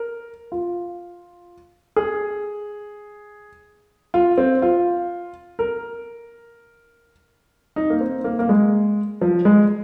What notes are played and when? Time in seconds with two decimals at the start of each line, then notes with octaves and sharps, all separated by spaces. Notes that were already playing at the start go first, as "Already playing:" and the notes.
Already playing: A#4
0.52 F4
1.96 G#4
4.14 F4
4.38 C4
4.62 F4
5.59 A#4
7.76 D#4
7.90 A#3
8.01 C4
8.24 A#3
8.39 A#3
8.49 G#3
9.21 F3
9.45 G#3